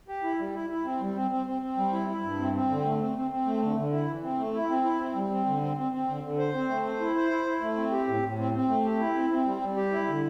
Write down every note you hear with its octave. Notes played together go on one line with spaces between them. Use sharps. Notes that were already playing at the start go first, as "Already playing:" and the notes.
G4
E4
G3
E4
E4
C4
G3
C4
C4
C4
C4
G3
E4
E4
G2
C4
C4
D3
A3
C4
C4
C4
A3
D3
D3
E4
E3
C4
A3
E4
C4
E4
C4
G3
C4
D3
C4
C4
C4
D3
D3
C5
C4
A3
C5
E4
C5
E4
E4
A3
C4
G4
A2
A2
C4
C4
A3
G4
E4
C4
C4
G3
G3
G4
E4
D3